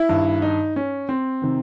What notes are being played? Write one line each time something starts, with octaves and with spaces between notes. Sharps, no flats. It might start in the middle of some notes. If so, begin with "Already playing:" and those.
Already playing: E4
G2 D#3
D#4
C#4
C4
C3 D#3